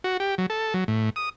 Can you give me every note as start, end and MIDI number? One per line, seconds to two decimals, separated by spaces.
0.04 0.17 66
0.20 0.35 67
0.38 0.46 54
0.50 0.74 69
0.74 0.84 54
0.88 1.10 45
1.16 1.29 87